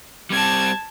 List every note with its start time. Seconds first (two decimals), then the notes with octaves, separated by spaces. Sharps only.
0.30 G3 C4 A5 G#6